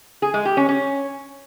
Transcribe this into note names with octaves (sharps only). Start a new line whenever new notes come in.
G#4
G#3
G4
C#4
C#4